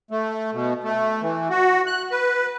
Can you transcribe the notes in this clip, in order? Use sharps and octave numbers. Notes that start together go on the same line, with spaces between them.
A3
B2
A3
E3
F#4
F#6
B4